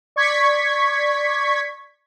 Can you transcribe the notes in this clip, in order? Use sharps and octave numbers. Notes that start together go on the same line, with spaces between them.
D5 C#6 G#6 B6